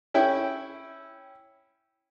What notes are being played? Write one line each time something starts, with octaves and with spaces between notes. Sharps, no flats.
C#4 E4 G5 E6